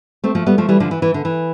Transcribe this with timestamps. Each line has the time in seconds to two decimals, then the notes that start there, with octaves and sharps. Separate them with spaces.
0.24 A3 C4
0.35 F3 A3
0.46 G3 B3
0.58 F3 A3
0.69 E3 G3
0.80 D3 F3
0.91 E3
1.02 E3
1.14 D3
1.25 E3